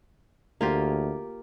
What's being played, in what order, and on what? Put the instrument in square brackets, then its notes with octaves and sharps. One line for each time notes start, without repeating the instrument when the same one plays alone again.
[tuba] D2 [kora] A#3 F4 G4